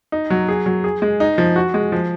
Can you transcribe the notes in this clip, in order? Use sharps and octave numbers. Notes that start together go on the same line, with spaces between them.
D#4
F#3
G#4
F#3
G#4
G#3
D#4
F3
F#4
G#3
F3